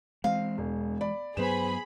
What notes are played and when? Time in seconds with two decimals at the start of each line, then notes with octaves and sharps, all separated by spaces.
0.24 E3 G#3 C4 F5
0.58 E1
1.01 D5 B5
1.37 G2 F#3 B3 G#4 B4 C5 B5 E7